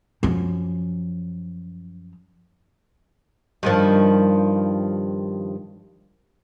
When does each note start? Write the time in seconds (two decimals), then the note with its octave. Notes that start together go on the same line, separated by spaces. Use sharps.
0.23 F#2 F3
3.63 G2 D#3 F3